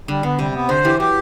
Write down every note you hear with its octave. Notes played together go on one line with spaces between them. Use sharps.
D3 G3
D3 B3
C3 G3
B3
D3 C5
E3 G4
F#3 G4